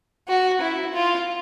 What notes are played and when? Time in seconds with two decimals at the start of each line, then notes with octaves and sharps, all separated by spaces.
0.28 F#4
0.61 E4
0.94 F4